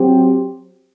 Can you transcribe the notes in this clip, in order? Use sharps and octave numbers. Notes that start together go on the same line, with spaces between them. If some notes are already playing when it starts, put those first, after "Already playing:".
Already playing: F#3 C4 G4